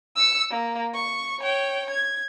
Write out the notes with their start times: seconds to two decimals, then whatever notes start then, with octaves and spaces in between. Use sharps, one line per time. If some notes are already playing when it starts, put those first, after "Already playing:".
0.16 E6 C#7
0.51 A#3
0.94 C#6
1.40 C#5 G5
1.90 G#6